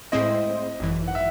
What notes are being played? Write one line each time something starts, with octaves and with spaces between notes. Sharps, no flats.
A2 G#3 C4 E4 C5 D#5
G#1 F#2 E3
F#5
E5